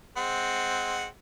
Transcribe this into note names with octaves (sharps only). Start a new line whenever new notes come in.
G#3 C4 F#5